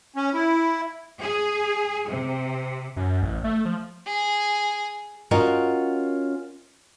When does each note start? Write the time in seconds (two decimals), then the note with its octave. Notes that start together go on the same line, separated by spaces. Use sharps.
0.16 C#4
0.34 E4
1.20 G#4
2.08 C3
2.96 F#2
3.22 A1
3.44 A3
3.65 F3
4.07 G#4
5.31 C#4 F4 F#4 A#4 C#5 D#5